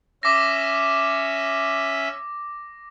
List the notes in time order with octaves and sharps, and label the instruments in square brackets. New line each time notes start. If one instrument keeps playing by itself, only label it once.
[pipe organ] C#4 E5 [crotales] D6 A#6